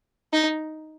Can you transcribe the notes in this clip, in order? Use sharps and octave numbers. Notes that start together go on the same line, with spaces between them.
D#4